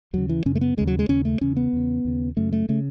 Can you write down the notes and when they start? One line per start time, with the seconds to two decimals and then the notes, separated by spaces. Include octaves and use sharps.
0.13 D#2 C#3 F#3
0.29 E3
0.45 F#2 C#3 C#4
0.55 A3
0.61 B3
0.77 D#2 C#3 G#3
0.87 F#3
0.99 G#3
1.09 D#2 C#3 C#4
1.25 A3
1.41 E2 C#3 C#4
1.57 B3
1.73 E2 C#3
2.05 D#2 C#3
2.36 F#2 C#3 A3
2.53 A3
2.69 C#3 A3